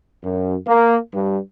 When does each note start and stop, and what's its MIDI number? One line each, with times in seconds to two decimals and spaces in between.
0.24 0.55 42
0.67 0.96 58
1.14 1.38 43